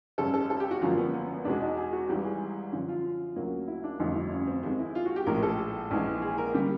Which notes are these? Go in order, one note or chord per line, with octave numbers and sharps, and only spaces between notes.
G#1 F#2 C#3 A4
A4
A4
G4
F#4
G#1 F#2 D3 F3 A#3 F4
B3
B3
B3
E2 B2 G#3 D4
D#4
G#4
F#4
G#1 G#2 E3 G3 G4
G#4
F#2 D3 F3
F4
D2 C#3 F#3 A#3
E4
D4
G1 F2 D3 F#3 A3 D#4
E4
C#4
C4
D#2 D#3 G#3 C4
E4
F4
F#4
G4
A#1 A2 F3 G#3 A#4
A4
A#1 G#2 E3 G#3
G#4
A#4
D3 G3 A#3 G4